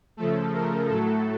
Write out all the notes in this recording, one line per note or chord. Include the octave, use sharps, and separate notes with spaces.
C#3 F3 A3 A4
A#4
A2 F#3 A3 A4